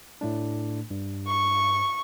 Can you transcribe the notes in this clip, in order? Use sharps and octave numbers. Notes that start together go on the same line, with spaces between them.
A2 A3 D4
G2
C#6